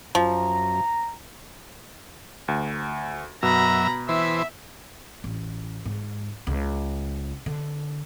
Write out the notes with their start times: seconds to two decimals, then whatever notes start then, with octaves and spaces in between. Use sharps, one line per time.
0.15 F#2 F3 A#5
2.48 D2
3.43 F#2 B2 E5 A#5 B5
4.09 E3 B4 C5 E5
5.24 A1
5.85 G#2
6.47 C#2
7.46 D3